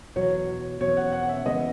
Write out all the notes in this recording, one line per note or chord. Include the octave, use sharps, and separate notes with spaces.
E2 B2 F#3 C#5
E2 B2 F#3 C#5
F#5
F#5
F#5
E5
E2 C#3 G#3 B3 D#5